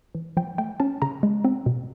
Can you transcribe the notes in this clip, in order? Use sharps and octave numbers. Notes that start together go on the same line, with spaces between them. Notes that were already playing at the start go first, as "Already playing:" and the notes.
E3
F3 G5
A3 G5
C#4 A5
C#3 A#5
G#3
C4
B2